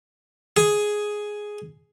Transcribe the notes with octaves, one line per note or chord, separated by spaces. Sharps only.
G#4